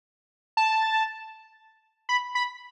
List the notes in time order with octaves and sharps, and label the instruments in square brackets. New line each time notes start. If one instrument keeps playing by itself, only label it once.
[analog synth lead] A5
B5
B5